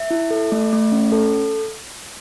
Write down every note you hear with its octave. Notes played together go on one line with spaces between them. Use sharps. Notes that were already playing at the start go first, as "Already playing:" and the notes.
Already playing: E5
E4
A4
A3
A3
C#4
A4